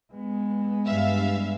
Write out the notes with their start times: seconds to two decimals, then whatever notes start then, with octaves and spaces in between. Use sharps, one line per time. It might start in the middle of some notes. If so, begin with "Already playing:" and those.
0.13 G#3 B3
0.87 G2 E5 F5